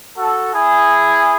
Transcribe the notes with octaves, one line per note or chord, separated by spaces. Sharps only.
F#4 A4
E4 G#4